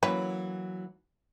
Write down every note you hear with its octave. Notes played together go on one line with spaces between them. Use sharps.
E3 F#3 A#3 C#4 B4